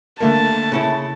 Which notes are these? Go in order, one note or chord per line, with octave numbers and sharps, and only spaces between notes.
D3 A3 A#3 A5
C#3 C#4 E4